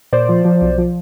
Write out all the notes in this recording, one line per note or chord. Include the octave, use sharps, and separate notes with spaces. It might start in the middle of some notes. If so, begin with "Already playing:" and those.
A#2 C5 D5
F3
F3
B1
F3